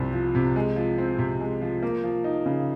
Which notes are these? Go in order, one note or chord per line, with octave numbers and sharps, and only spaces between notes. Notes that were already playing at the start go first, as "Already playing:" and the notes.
Already playing: C2 C3 F3 C4
F3
C3
G#3
F3
C4
C3
G#3
F3
A#3
F3
D#4
C#3